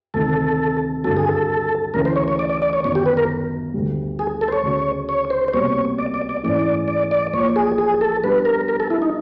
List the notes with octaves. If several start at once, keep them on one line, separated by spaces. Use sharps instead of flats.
D2 C3 D#3 A4
G2 D3 F#3 A4
G#4
A4
D2 C#3 E3 A3 C#4 A#4
C5
C#5
C#5
D5
D5
D5
C#5
G1 F#2 D#3 C#5
G4
B4
A#4
D2 D3 G3
G#4
A4
C5
C#5
D2 C#3 F#3
C#5
C5
C5
C2 B2 G3 A#3 C#5
D5
D5
D5
G#2 E3 A3 C#4 E4 D5
D5
D5
A#1 A#2 F3 C#5
G#4
G#4
A4
B2 G3 B3 D4 G4 B4
A#4
A#4
A4
E4
D#4